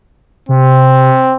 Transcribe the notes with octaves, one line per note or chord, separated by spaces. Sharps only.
C3 C4